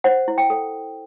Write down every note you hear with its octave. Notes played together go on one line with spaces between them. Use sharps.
C5 F#5
E4
G5
A4